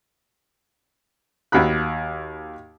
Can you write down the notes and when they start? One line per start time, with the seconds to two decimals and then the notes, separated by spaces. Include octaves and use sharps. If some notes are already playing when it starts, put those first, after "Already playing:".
1.52 D#2 F#4 B5 F#6